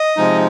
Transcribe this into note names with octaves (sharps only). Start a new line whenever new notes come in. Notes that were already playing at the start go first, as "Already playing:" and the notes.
Already playing: D#5
C3 F3 G#3 D#4